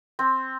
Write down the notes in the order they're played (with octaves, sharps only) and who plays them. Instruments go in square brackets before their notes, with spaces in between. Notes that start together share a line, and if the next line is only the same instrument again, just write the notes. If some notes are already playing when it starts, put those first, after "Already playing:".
[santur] C4